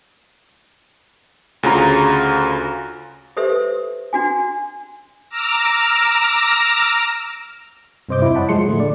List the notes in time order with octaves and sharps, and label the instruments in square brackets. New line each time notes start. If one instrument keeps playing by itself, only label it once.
[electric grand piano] D2 C#3 F4 A#5
[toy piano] G4 A4 B4 C5 E5 D#6
D4 F#4 G#5
[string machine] A#5 D6 E6 F6 A#6
[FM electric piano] G2 C3 C5 D#5 D6 G6
F2 E4
C#5 D#5 F#5 A5 B5
F3 G#3 C6 C#7
A2 D3 A3
D5